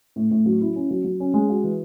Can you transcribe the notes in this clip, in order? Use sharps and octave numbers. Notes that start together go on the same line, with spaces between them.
A2
A2
F#3
E4
C#4
F#3
F#3
C#4
G#3
F#4
E3